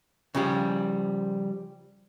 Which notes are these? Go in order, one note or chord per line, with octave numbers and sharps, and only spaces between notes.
C#3 F3 G3